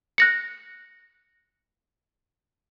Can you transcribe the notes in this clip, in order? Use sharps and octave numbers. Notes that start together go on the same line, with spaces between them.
F#6 A#6 C#7